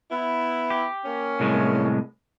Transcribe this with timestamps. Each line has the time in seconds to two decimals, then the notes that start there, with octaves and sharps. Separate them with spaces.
0.11 B3 E4
0.70 G4
1.05 A#3 C#4
1.40 C2 A2 G#3